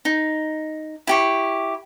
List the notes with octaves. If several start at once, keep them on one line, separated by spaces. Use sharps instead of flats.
D#4
E4 G4 C#6